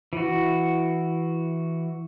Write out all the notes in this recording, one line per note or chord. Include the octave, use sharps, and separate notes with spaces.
E3 F#4